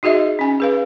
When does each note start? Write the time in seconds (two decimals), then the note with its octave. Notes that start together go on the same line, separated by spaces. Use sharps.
0.03 D#4 F#4 G#4 D#5 E5
0.39 C#4 G#5
0.60 G#4 B4 F5